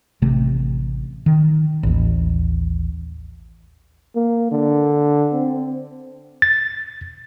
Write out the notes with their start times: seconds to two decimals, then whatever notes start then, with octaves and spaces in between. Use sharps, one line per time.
0.22 A1 C3 A3
1.26 D#3
1.83 A1 D#2
4.16 A#3
4.52 D3
5.33 C4
6.42 A6